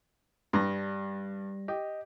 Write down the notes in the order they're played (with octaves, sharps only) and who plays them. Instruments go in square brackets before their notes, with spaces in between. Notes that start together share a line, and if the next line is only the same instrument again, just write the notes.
[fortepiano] G2 [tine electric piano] G3 A#6
[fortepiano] G4 [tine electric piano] D#5